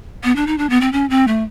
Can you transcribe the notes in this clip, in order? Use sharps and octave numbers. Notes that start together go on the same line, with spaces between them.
B3
D4
D#4
D4
B3
C4
C#4
C4
A3